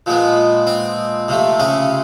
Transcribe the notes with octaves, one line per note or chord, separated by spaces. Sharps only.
A#2 F3 G#3 B3
C4
C3 F3 A3
C#3 C#4